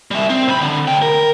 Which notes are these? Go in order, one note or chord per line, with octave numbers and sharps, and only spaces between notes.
G3 E5
C4
B1 B5
D3
D2 G5
A#4